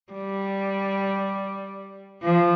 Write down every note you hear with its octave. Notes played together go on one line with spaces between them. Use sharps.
G3
F3